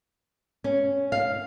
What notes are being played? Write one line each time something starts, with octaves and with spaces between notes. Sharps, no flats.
C#4
F5